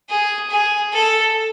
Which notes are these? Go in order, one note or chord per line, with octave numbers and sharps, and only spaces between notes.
G#4
G#4
A4